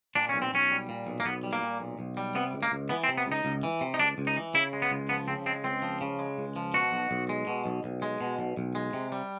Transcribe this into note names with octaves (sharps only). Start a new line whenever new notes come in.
A#2 D4
B1 C#4
C4
B1 C#4
G3
A#2
B1
A#3
B1 B3
G3
A#3
A#2
B1
B1
G3
C3 B3
C#2
A#3
C#2
E3 B3
C4
C3
B3
C#2
D#4
C#2
E3
C3
D#4
C#2 D4
C#2
D#4
E3
C#3 E4
G#3
B3
C#2
F3 B3
C#3 C4
G#3 C4
C#2 C4
F3
C#3
G#3
C#2
F3
B2 F#4
B1
B1
G#3
B2
B1
B1
G#3
B2
B1
B1
G#3
C3
G3